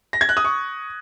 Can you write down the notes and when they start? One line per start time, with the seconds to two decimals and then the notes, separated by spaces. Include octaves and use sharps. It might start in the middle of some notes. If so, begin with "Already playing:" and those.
0.13 A#6
0.21 G#6
0.29 F#6
0.37 D#6
0.44 C#6